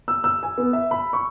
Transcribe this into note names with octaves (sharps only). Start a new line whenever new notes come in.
E6
E6
G#5
B3
E5
B5
C#6